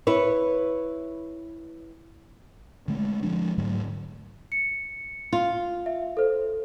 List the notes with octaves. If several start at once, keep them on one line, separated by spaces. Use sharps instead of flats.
E4 B4 C#5
D3 G#3 A3
F3 G#3 D4
G#2 D3 F#3 A3
C#7
F4
E5
A4 C5